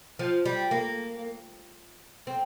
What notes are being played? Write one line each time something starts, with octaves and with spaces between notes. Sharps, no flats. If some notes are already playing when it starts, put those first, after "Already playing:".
F3
G3
A#3
C4